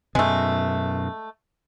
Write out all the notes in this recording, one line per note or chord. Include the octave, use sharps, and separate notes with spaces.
F#2 B2 G#3 A3